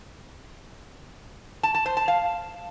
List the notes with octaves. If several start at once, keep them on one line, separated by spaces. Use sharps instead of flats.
A5
A5
C5
A5
F5